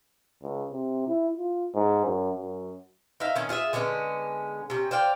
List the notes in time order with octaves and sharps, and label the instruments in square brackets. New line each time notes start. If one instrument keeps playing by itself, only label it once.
[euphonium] C#2
C3
E4
F4
G#2
F#2
F#2
[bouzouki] D#4 E5 F5
D#3 C#4
F4 G#4 D#5 E5
D3 G#3 B3 C#4
C3 C#4
C5 D5 F5 G5